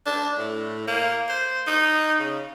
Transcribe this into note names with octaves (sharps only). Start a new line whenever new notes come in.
D4
A2
A#3
C5
D#4
C#3